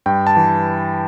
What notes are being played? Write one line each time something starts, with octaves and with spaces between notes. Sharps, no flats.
G2 G5
A5
E3